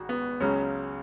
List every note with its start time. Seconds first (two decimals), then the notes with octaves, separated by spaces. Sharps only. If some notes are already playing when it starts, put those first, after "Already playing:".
Already playing: G#1 G#2 F#4
0.09 B3
0.40 C#2 C#3 F#3 C#4